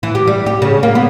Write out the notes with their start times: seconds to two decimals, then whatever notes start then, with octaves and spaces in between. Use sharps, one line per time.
0.03 E3
0.15 G4
0.27 G3
0.46 G4
0.62 C#3
0.83 A#3
0.95 B3